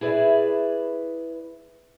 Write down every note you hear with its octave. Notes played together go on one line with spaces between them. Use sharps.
E4 G#4 B4 D5 E5